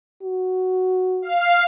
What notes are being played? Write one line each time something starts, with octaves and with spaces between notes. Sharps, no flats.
F#4
F5